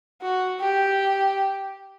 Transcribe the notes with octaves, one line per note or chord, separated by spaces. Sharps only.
F#4
G4